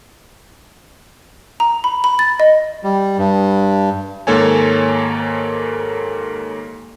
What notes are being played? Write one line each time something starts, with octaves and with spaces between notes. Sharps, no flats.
A#5
B5
B5
A6
D#5
G3
G2
D#2 G#2 A#3 A4 C#5 G#5